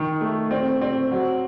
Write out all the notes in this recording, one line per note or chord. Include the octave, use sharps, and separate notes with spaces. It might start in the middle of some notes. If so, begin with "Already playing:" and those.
Already playing: D#3
A3
C4
C4
F#3